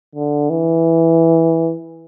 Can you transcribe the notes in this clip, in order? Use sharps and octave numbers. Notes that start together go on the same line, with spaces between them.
D3
E3